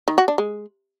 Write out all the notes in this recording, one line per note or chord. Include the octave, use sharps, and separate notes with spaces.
D#3
F#4
D4
G#3